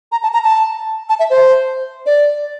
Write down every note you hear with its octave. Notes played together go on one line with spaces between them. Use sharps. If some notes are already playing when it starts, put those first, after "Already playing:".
A#5
A5
A#5
A5
A5
E5
C5
D5